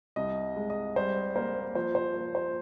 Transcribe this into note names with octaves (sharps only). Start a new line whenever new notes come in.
C2 D#5
G#3
D#5
G3 C5
A#3 C5
F3 C5
C5
A#3
C5